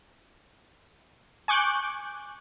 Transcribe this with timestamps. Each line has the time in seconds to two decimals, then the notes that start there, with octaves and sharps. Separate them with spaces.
1.48 G#5 C#6 D6 F#6 G6